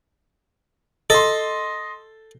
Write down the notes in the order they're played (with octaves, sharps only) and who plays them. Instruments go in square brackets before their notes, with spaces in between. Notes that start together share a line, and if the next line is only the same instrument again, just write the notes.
[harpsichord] A4 [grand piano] D#5 C6